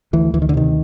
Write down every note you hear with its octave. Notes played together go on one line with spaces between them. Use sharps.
D2 E3
D2 E3
D#3
D3
C3 D#3